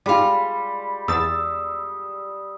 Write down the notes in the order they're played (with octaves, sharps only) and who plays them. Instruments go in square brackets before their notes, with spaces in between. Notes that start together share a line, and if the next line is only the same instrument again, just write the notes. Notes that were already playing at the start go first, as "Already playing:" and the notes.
[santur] G3 [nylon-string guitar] G#3 F4
[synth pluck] E2 A6 [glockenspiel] D#6 [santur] E6